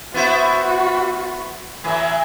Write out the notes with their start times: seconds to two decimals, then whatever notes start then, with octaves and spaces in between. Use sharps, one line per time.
0.14 B3 E4 F#4 C5
1.84 A2 E3 F#3 G#5